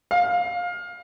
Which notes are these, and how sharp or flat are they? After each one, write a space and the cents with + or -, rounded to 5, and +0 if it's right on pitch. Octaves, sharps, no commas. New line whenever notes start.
F5 +20